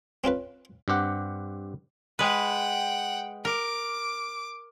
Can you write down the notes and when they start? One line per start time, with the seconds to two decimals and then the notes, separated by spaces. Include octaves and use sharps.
0.24 C4 C#4 F4 B4
0.88 G2 C4 G4 F#5
2.19 G#3 B4 F#5 G5
3.45 A#4 D6